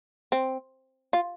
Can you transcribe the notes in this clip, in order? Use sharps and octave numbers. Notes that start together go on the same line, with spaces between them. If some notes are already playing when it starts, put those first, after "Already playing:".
C4
F4